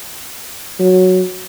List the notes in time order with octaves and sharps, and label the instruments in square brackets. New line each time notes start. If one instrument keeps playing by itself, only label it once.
[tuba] F#3